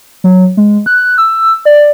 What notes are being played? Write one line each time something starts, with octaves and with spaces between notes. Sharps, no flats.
F#3
G#3
F#6
E6
D5